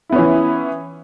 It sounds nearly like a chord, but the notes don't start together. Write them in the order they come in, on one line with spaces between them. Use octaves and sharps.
E4 B3 C#4 E3